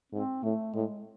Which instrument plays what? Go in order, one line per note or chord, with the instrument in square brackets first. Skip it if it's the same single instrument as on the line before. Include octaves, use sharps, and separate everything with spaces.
[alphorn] G#2 [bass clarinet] C4
[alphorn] A2 [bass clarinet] A3
[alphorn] A2 [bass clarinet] G#3